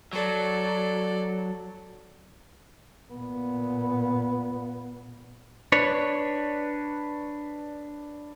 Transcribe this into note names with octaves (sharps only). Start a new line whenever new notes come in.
F#3 A4 D5
A#2 B3
D4 B4 C#5